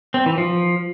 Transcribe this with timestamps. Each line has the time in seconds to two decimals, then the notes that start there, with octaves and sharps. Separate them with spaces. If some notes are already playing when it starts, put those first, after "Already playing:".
0.14 C4
0.26 E3
0.38 F3